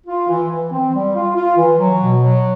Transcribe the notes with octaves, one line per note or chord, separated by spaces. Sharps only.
F4
E3
E3
C4
G3
F4
F4
E3
F#3
B2
F#3